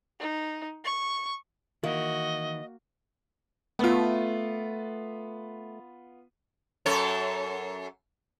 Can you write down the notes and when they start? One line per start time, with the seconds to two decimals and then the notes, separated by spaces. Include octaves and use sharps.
0.20 D#4
0.84 C#6
1.84 D#3 E3 A#3 E4 F#4 D#5
3.79 A3 B3 F4
6.86 F#2 A4 C#5